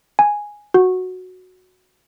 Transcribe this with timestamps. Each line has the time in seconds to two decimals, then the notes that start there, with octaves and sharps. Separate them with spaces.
0.19 G#5
0.74 F#4